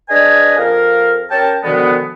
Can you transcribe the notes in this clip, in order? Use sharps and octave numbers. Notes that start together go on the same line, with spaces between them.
D4 G#4 B4 D#5 G#5
F2 A#4 F5
C#4 G4 A#4 C#5 G5 A5
B2 D3 D#3 F3 G#3 B3